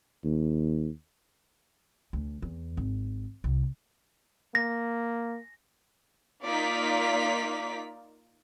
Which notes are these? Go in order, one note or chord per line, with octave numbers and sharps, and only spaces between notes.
D#2
D2
E2
G#1
C2
A#3 A#6
A#3 D#4 F4 D5 B6